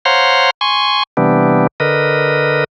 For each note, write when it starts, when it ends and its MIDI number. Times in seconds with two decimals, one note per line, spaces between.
0.05 0.50 72
0.05 0.50 73
0.05 0.50 77
0.05 0.50 78
0.05 0.50 82
0.05 0.50 84
0.61 1.03 80
0.61 1.03 84
0.61 1.03 85
1.17 1.67 48
1.17 1.67 52
1.17 1.67 55
1.17 1.67 59
1.17 1.67 62
1.80 2.64 50
1.80 2.64 70
1.80 2.64 71
1.80 2.64 75